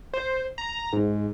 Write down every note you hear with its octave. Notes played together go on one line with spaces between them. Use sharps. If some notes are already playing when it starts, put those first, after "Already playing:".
C5
A#5
G#2